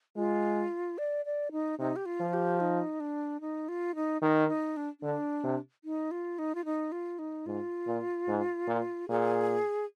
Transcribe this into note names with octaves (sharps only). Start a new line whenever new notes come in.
G#3 F4
D5
D5
D#4
C3 D#4
G4
F4
F3
G4
D#4
D4
D#4
F4
D#4
D#3 D#4
D#4
D4
D3 D4
C3
D#4
F4
D#4
F4
D#4
F4
D#4
G#2 F4
A#2
G#2
A#2
A#2 G#4